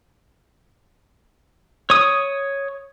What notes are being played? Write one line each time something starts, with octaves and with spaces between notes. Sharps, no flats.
C#5 D#6